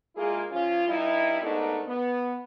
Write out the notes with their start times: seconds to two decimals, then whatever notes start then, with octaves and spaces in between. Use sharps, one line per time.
0.15 G#3 A#3 E4 F4 G#4
0.51 F3 C#4 F4
0.87 G2 G3 D#4 E4
1.41 G#2 A3 B3 D4 D#4 A#4
1.86 B3